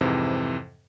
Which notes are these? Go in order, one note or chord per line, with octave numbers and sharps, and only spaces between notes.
F2 G#2 C3 E3